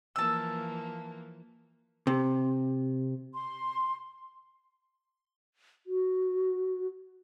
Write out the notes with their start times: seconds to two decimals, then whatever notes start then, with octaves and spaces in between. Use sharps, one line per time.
0.16 E3 F3 A#3 A5 E6
2.07 C3
3.34 C6
5.87 F#4